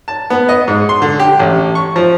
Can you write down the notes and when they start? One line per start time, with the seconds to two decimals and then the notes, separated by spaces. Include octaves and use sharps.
0.08 A5
0.30 B3
0.49 D#5
0.68 G#2
0.89 C6
1.02 D3
1.20 G4
1.39 A1
1.75 C#6
1.96 F3